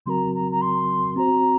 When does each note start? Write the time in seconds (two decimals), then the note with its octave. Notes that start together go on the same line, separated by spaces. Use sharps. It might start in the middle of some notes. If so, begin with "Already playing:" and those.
0.06 C#3 F#3 C4 F#4 A#4 A#5 C6
0.34 A#5
0.51 A#5
0.61 C6
1.16 C4 F#4 C5 A#5